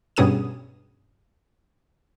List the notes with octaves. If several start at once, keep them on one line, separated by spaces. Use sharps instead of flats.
G2 B2 C#4 G#4 D#6 D#7